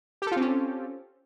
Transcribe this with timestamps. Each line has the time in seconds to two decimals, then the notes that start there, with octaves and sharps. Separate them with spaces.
0.22 G4
0.27 A4
0.32 F4
0.37 C4
0.41 C#4